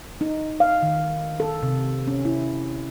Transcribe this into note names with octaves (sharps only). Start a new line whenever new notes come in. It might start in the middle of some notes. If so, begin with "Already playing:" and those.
D#4
F5
D#3
A4
C3
C#4
E4